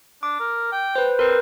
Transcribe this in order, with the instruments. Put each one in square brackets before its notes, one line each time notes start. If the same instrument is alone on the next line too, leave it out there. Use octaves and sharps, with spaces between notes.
[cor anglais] D4 [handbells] D6
[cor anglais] A#4
G5
[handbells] B4 C5
[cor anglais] C4 [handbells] A#4 B4